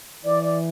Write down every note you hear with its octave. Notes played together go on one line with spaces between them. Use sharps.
E3 D5
D5